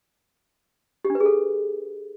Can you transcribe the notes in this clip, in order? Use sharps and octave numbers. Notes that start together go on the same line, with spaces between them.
G4
D4
B4
G#4
A4